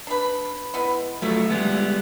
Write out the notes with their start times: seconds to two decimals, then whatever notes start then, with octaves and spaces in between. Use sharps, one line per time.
0.07 D4 B4
0.74 G#3 B3 E4
1.22 F3 F#3 A3 E5
1.50 G3 G#3 B3